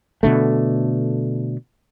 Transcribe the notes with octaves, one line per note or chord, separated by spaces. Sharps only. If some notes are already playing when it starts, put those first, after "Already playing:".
B2 D3 A3